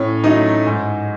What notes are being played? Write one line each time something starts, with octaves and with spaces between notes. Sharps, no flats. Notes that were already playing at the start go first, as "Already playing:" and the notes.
Already playing: A2 C#4
F#3 A3 D#4
G#2